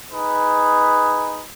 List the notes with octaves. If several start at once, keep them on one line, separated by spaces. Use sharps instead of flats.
D#4 G#4 B4